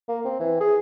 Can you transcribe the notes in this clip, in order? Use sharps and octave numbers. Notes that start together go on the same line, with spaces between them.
A#3
C4
E3
G#4